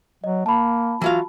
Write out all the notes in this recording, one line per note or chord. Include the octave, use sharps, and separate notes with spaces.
F#3 D#5
A#3 A5 B5
E3 F#3 F4 F5